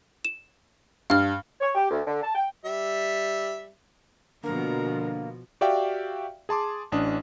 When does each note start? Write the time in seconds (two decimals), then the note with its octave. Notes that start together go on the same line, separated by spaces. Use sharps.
0.25 E7
1.10 G2 F5 F6
1.61 C#5
1.75 G4
1.91 D2
2.06 D3
2.23 A5
2.35 G5
2.65 G3 E5
4.44 B2 D3 F3 A#3 A#4
5.61 F#4 G4 D5 E5 F5 G5
6.49 G#4 A5 C6 D6
6.92 A1 C#4 D4 D#6